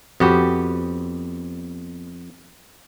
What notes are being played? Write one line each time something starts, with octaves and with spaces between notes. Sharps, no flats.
F2 B3 F#4 G4